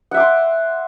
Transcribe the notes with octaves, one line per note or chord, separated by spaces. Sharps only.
E5 F#5 C6 D6